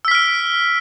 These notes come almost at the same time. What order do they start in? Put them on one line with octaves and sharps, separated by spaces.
E6 B6 F6 D7